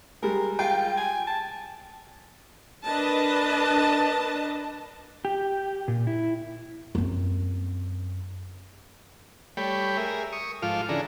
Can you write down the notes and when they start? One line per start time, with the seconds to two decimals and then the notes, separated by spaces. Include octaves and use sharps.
0.22 G3 G#3 A#4
0.59 F4 G5
0.97 G#5
1.27 A5
2.85 D4 A#4 B4 D#5 A5
5.25 G4
5.88 A#2
6.07 E4
6.95 F#2 C4
9.57 G3 A3 C#5 G5 B5
9.97 G#4 A#4 E5
10.32 C#6 D#6
10.62 G#2 F3 F4 A4 D6 F6
10.89 C#3 E3 D4 G#4 A4 A#5